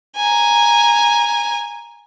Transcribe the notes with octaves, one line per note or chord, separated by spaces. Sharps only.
G#5 A#5